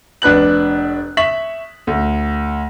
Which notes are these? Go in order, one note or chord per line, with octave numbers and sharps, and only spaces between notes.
F1 D4 B4 F#6 F#7
E5 C#6 B6 F#7
D2